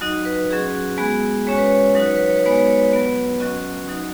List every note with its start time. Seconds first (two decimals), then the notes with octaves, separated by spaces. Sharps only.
0.01 F#3 D#4 F#4 D#5
0.25 B4
0.50 F#3 C#4 F#4 G#4
0.75 F#4
0.98 G#3 B3 F#4 G#4
1.47 G#3 C#4 F#4 C#5
1.57 B4
1.67 C#5
1.95 F#3 D#4 F#4 B4
2.06 C#5
2.16 B4
2.26 C#5
2.36 B4
2.43 G#3 B3 D#4 F#4 C#5
2.57 B4
2.67 C#5
2.78 B4
2.91 F#3 B3 F#4
3.40 F#3 C#4 F#4 D#5
3.88 F#3 D#4 F#4